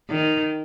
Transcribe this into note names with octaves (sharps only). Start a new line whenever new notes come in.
D#3